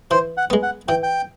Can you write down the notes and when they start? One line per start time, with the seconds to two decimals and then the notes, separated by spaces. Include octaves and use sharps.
0.11 E3 C5
0.37 F#5
0.50 G#3 B3
0.63 F#5
0.88 E3 G5
1.03 G5